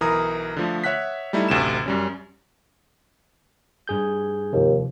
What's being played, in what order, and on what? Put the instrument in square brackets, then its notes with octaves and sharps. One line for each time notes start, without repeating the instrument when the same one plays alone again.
[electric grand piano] B1 E3 A#4 A#5 D#6
D3 F3 A3
C#5 E5 F#5 F#6 B6
G3 A3 D#4 E4
A1 D2 C3 E7
F#2 G3 C#4
[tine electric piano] G2 G#4 G6
[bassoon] D#2 [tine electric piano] C3 F3